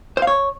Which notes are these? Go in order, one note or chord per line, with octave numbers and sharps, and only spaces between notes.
C5
F5
C#5